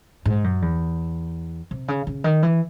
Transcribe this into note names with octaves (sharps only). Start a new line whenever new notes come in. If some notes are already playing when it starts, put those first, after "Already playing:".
G#2
F#2
E2
C3
C#3
C#3
D#3
E3